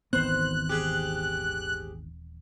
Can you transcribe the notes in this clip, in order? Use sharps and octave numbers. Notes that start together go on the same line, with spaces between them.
D#1 G#1 D#3 E3 B3 C4 C5 F#6
G4 G#4